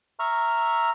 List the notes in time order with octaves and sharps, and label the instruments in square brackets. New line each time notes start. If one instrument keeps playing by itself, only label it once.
[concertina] E5 A#5 C#6 F6